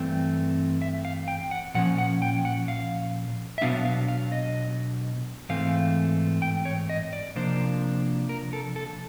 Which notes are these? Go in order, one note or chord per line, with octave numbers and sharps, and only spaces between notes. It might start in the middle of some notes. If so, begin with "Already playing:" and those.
Already playing: G2 E3 A3 C4
E5
F5
G5
F#5
A#2 F3 C#4 F#5
F#5
G5
F#5
F5
E5
B2 F#3 B3 D4 F5
F5
F5
D#5
G#2 E3 A3 C4 F5
G5
C#5
D#5
D5
C3 F3 A#3 D4 C5
A#4
A4
A4